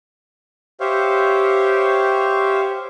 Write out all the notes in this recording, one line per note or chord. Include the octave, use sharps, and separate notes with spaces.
G4 C5 C#5 E5 F5